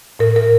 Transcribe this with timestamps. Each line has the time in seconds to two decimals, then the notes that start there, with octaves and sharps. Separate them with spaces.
0.19 A2 A#4
0.36 A#4